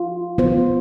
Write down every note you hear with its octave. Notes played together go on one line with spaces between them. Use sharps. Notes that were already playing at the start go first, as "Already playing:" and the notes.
Already playing: F4
B3 F4 C5